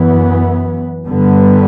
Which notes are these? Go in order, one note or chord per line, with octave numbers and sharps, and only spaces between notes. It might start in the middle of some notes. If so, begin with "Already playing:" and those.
Already playing: F#2 E3 B3
G2 D3 G3 B3